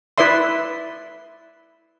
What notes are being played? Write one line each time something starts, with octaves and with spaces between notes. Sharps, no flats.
E4 B4 D5 E5 C6